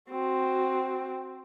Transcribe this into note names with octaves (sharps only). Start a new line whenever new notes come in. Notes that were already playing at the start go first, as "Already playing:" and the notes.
C4 F#4